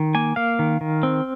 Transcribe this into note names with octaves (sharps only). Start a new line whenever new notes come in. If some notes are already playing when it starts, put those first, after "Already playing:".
Already playing: D#3
A#3 G#5
A#3 F5
D#3
D#3
C4